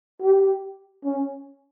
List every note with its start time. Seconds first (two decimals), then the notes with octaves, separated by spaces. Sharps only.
0.22 G4
1.05 C#4